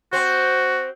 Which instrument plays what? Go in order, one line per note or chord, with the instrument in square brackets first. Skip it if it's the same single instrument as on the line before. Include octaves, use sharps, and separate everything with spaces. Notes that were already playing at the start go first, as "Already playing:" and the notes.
[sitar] C4 C5 [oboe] F#4